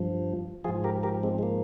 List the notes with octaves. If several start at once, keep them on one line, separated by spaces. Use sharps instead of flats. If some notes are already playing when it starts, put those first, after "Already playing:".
Already playing: G2 F3
G#2 F3 F4 G#4
G4 A#4
G4 A#4
G#3 C4
G#3
A#3